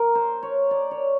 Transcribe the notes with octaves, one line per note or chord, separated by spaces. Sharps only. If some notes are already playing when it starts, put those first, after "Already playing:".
Already playing: A#4
C5
C#5
D5
C#5